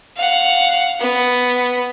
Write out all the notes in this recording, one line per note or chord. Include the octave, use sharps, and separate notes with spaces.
F5 F#5
B3